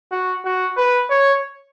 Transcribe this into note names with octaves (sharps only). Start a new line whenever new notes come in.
F#4
F#4
B4
C#5